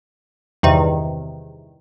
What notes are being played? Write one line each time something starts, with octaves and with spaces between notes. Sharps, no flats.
E2 G2 C3 D#3